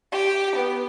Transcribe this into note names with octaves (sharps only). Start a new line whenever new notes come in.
G4
B3